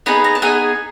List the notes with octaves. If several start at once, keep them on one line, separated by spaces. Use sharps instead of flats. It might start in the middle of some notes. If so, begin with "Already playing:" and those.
B3 D#4 G#4 B5
A#5
A5
B3 D#4 G#4 G#5